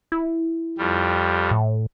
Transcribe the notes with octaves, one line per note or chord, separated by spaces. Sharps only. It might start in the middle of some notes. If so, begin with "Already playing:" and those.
E4
F2 G3
A2